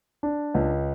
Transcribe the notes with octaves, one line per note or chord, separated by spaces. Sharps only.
D4
C#2